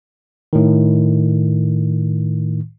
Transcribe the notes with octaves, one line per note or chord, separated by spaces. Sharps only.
A2 D#3